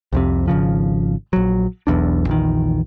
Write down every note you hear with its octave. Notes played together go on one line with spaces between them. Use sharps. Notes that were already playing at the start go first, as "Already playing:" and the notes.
C2 F2 C3
G#1 C#2 C#3 F3
A#1 F#3
E1 B1 E2 D4
A#1 E2 D#3